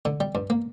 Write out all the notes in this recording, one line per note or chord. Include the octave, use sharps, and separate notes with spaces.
D3
G3
G2
A#3